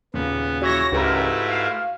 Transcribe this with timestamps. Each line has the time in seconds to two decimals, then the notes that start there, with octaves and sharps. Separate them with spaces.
0.14 D#2 A#2 C#3 B3
0.62 E3 E4 F#4 C#5 A#6
0.92 C#2 G#2 A3 E4 G4 A#4 B4
1.48 F5